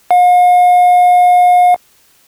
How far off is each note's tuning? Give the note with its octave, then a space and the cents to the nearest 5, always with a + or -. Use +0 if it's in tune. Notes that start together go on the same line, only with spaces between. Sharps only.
F5 +45